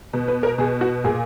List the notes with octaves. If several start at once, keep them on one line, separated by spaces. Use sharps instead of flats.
B2
B4
A#4
B2 G#4
F#4
A#2 G#4